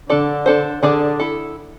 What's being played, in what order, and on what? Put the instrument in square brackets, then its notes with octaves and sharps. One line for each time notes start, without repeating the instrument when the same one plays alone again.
[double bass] D3 [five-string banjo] D4 A4 D5
[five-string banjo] D4 A4 C5
[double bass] D3 [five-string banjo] D4 G#4 D5
[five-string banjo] E4 A4